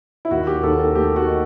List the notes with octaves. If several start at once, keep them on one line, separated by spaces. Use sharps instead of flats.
E4
D#2 F#4
G4
D#2 A4
A4
A3 G4
F#4
D#3